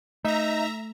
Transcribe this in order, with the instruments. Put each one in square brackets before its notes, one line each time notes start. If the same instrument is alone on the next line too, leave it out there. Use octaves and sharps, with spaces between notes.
[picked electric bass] A3 [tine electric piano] D#4 [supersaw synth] E5 A#5